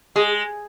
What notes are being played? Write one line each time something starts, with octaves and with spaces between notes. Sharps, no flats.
G#3 G#4